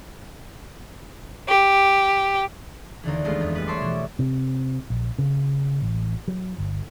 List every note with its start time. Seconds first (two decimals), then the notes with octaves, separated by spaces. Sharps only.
1.48 G4
3.03 D#2 D3 E3
3.25 G#3 A3 B3 F4
3.41 F2
3.55 G3 B4
3.67 C#5 E5 A5 C6 D6
3.80 B2 E3
4.19 C3
4.90 A#1
5.18 C#3
5.82 A1
6.28 F#3
6.58 G1